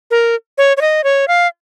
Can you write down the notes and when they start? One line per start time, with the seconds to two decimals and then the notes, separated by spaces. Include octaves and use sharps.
0.11 A#4
0.58 C#5
0.77 C#5
0.81 D#5
1.04 C#5
1.28 F5